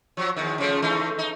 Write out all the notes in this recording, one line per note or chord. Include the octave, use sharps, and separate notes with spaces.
F3 F#3
E2 D#3
C#3 F3 A3
E3 A3 D#4
D#4